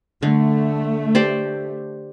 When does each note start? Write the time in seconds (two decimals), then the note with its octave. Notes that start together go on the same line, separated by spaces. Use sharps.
0.23 D3 A3
1.15 G4 C5 D5